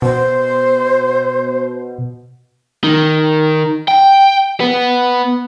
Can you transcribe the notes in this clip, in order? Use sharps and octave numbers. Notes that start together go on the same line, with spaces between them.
B2 C5
D#3
G5
B3